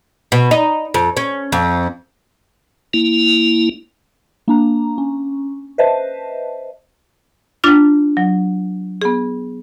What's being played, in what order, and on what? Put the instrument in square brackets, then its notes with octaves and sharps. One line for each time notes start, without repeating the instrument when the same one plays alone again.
[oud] B2
D#4
F2
C#4
F2
[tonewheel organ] A#3 E4
[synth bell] A#3 D4 A#5
C#4
B4 C5 D#5 E5 A5
[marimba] D4 F4 A6
F#3
B3 G#4